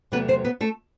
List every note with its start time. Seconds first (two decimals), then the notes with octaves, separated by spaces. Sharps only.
0.12 E2 C3 F#3 A3 B3 B4
0.28 C4 C5
0.44 B3 B4
0.61 A3 A4